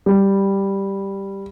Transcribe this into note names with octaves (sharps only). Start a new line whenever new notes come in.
G3